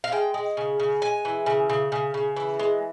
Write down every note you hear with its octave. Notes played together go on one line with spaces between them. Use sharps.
F5
G#3 G5
G#3
C#3
C#3
G#3 G#5
E3
C#3
C#3
C#3
C#3
E3
G#3